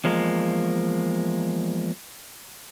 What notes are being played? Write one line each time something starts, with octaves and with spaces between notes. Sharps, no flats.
E2 F3 G#3 A#3